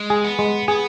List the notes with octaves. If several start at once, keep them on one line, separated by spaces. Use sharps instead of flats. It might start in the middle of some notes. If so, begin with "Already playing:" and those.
Already playing: G#3
G#4
B3
G#3
B3 G#4